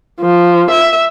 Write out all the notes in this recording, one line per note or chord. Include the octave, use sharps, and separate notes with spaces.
F3
E5